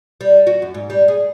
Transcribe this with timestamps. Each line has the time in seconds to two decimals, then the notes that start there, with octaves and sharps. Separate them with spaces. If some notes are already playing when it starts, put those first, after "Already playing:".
0.21 G3
0.47 F#4
0.62 F#2
0.74 G#2
0.90 G3
1.08 G#4